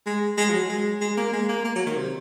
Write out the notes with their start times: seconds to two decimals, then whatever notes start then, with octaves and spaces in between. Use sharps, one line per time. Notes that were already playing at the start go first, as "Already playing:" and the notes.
0.06 G#3
0.38 G#3
0.49 F3
0.54 F#3
0.69 G#3
1.01 G#3
1.17 A#3
1.33 G#3
1.49 A#3
1.64 A#3
1.75 F#3
1.86 D#3
1.97 C3